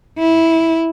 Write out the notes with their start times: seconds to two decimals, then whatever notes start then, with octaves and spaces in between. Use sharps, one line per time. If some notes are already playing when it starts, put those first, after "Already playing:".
0.19 E4